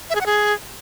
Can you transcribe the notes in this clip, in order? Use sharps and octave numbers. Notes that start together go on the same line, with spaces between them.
E5
G#4
F#5
G#4